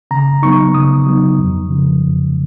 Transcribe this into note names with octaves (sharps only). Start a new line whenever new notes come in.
C#3 A#5
F#3 B3 D#4 C#6
C#3 D#6
F#3 B3 D#4
F2
C#3 F3
F2